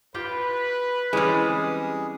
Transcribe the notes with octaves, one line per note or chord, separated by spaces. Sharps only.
F4 G4 B4 G5
E3 G3 G#3 C4 C#4 G#4